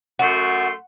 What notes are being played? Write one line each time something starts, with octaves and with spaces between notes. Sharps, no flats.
F#2 A3 F#4 C6